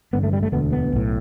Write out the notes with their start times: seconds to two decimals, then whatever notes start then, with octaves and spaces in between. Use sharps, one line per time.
0.13 A1 G2 D3 B3
0.24 A3
0.33 G3
0.43 A3
0.52 E1 D2 D3 B3
0.73 B3
0.92 B1 A2